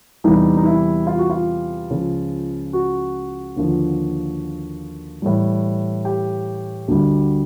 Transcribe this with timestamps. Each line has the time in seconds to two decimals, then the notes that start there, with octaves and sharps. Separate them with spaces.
0.24 E2 C3 E3 G3 D#4
0.57 D#4
0.66 E4
1.07 F4
1.19 F#4
1.30 F4
1.90 C#2 C#3 F3
2.73 F#4
3.56 D#2 D3 F3
5.22 A2 E3 G3
6.05 G4
6.88 D2 D3 G3